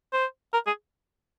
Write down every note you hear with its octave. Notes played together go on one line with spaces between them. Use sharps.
C5
A#4
G#4